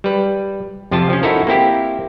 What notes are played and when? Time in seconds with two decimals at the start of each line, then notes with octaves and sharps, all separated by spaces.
0.04 G3 B4
0.91 F2 C3 F3 F4 A5
1.10 F3 C#4
1.23 D#4 E4 F#4 A4 A#4
1.47 A#3 C4 E4 G4